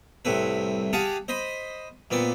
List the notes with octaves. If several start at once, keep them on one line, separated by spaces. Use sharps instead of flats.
C2 A2 C4 B4
G4 G#4 F5 F#5 A5
C5 D#5 B5 C6
A#2 B3 C4 D5